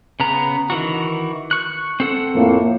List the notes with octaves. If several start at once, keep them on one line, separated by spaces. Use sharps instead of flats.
C#3 B3 A#5
D#3 E3 F#4
C#6 F#6
C4 A4 F#5
F2 A2 A#3